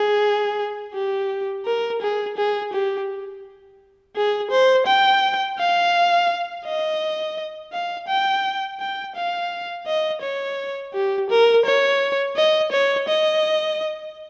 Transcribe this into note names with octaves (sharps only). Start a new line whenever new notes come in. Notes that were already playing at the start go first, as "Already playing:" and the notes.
Already playing: G#4
G4
A#4
G#4
G#4
G4
G#4
C5
G5
F5
D#5
F5
G5
G5
F5
D#5
C#5
G4
A#4
C#5
D#5
C#5
D#5